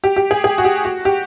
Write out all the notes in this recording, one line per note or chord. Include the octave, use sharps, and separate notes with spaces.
G4
G4
G#4
G#4
F#4
G4
F#4
G4